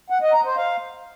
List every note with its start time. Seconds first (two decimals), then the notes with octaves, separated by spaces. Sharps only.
0.10 F#5
0.22 D#5
0.33 A#5
0.45 C5
0.56 F5